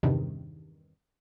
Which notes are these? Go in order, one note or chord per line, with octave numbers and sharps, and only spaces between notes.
E2 G2 C3 D#3